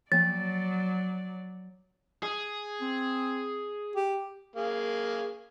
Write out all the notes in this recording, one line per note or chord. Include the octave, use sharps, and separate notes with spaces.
F3 F#3 A#3 D5 A6
G#4
C4
G4
A#3 G#4